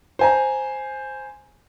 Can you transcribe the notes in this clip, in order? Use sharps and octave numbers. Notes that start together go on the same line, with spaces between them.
C5 G#5 A#5